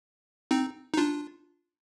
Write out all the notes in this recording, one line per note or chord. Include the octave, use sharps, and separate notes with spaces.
C4 D#4
D#4
D4 F4